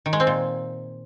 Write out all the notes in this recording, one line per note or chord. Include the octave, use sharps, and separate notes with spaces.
D#3
G#3
C4
A#2